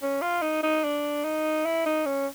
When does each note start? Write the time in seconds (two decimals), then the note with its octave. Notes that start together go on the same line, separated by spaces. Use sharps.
0.02 C#4
0.22 F4
0.42 D#4
0.63 D#4
0.84 D4
1.24 D#4
1.66 E4
1.86 D#4
2.06 C#4